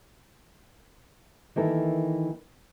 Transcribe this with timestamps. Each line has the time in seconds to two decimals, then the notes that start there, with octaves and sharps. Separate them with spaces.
1.56 D#3 E3 A#3 A4